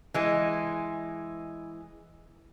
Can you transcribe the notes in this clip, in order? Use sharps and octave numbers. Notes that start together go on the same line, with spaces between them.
E3 G#3